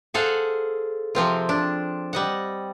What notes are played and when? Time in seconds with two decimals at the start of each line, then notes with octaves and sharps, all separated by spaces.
0.14 G#4 A4 C5 F5 F#5
1.15 C3 F3 C4 F4
1.49 D4
2.13 G3 D#5 F#5